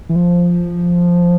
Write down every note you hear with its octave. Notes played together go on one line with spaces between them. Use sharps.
E3
F3